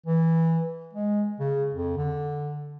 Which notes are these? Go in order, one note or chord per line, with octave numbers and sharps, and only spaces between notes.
E3
G#3
C#3
F2
D3